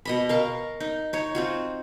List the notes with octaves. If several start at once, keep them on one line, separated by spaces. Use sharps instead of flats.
B2 D#5 B5
A#4 F5 C#6
D#4
D#4 C#5
C4 F4 F#4